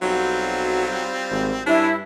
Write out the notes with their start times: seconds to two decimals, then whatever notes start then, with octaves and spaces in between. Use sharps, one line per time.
0.02 B1 F#3 G3 C4 F4
1.31 G#1
1.66 G2 C#4 D4 E4